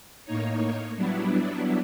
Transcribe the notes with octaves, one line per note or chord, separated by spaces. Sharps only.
A2 A#3 D#4 C#5
F#3 G3 B3 D4 E4